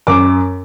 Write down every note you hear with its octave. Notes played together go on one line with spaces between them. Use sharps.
F#2 D6